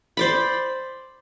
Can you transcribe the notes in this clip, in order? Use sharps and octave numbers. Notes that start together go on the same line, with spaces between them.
C5 D5 B5